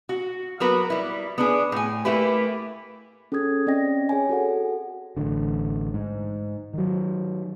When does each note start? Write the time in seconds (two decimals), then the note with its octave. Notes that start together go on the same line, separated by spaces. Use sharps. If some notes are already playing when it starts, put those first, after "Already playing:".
0.09 F#4
0.60 F#3 A#3 B3 F#4 A#4 B4
0.90 G3 E4
1.38 B3 D4 G#4
1.72 A2 G#5
2.05 A3 A#3 E4 G4 B4
3.32 C#4 G#4 A4 D#6 G#6
3.67 C4 C#4 D5 D#5 G5 A#6
4.09 G#4 C#5 G#5
4.29 F#4 A4 F#5
5.17 A1 D3
5.94 G#2
6.74 D#3 F#3